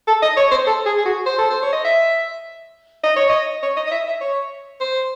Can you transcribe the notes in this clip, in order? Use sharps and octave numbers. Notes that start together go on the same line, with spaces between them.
A4
D#5
C#5
C5
A4
G#4
G#4
F#4
C5
A4
C5
C#5
D#5
E5
D#5
C#5
D#5
C#5
D#5
D#5
E5
E5
C#5
C5